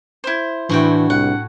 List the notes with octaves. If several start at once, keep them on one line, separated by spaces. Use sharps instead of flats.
E4 C5
A2 E3 D4 F#4 G5
C2 F#5